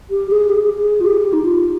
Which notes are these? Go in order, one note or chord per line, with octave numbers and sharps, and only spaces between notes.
G4
G#4
G4
G#4
F4
G4
D#4
F4